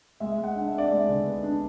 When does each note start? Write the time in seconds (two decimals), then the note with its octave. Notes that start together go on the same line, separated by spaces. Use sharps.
0.20 G#3 E5
0.38 G#3
0.44 F#5
0.56 D4
0.68 E5
0.74 D4 D5
0.88 G#3 E5
1.09 D3
1.26 B3
1.43 D4